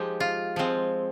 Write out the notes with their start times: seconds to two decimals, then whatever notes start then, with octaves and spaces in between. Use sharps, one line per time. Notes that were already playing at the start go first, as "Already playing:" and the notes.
Already playing: F3 G#3 D#4 G4
0.20 F4
0.56 F3 G#3 C4